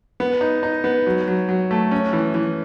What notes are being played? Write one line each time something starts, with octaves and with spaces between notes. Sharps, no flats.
B3
D#4
D#4
B3
F#3
F#3
F#3
A3
C#4
E3
E3